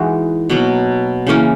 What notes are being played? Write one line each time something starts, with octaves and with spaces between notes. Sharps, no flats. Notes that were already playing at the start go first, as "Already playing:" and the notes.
Already playing: E3 G#3 D#4 F#4
B2 F#3 A#3
C#3 E3 A#3 C#4